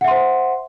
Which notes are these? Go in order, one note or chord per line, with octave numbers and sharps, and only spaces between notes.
C5 E5 F#5 C6